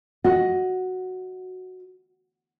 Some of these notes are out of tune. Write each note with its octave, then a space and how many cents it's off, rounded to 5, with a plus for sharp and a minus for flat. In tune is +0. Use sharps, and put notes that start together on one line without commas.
F#4 +0 D#5 +10